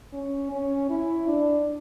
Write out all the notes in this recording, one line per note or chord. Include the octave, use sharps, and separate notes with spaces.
C#4
C#4
E4
D4